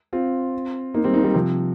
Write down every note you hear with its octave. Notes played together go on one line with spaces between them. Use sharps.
C4 F4
A#3 D#4
G3 C4
A#3 D#4
G3 C4
C3 F3